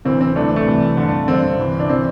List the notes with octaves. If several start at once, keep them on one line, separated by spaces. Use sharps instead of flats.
D2 C3 E3 C4
C4
C2 C3 E3 A3 D4
A3
C2 C3 E3
G2 D3
G2 D3 C4
C2 C3 E3
D4
C3 E3 C4